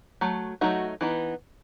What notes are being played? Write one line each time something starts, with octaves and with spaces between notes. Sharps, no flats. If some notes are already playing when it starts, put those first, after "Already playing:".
F#3 A3
F#3 A3 D#4 F#4
E3 B3 D#4